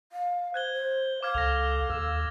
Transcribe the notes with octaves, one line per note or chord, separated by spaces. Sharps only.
F5
C5 F#6 G#6 G7
C5
F5 D6 F6 G#6
C#2 A4 A#6 F7
D#2 E6